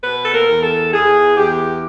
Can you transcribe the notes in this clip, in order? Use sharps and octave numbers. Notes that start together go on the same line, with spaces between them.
B2 B4
A4
A#4
E2
A4
E2 G#4
E2 G4